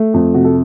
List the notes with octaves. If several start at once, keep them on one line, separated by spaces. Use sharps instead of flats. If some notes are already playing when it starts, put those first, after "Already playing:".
Already playing: A3
F2
C3 F#4
A4